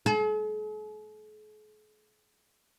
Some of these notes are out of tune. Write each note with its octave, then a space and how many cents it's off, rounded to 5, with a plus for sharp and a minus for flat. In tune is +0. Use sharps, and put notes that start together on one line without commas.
G#4 +45